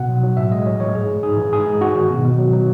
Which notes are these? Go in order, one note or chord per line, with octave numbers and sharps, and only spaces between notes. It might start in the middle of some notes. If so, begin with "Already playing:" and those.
Already playing: B2 F#5
F#3
F#3
A2 E5
G#3 D#5
A2 C#5
E3 C#5
G#2 G#4
G#3
G#2 G#4
E3
G#2 G#4
G#3
G#2 F#4
D#3
B2
B2
F#3
F#3